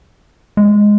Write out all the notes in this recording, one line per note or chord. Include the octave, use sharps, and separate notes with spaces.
G#3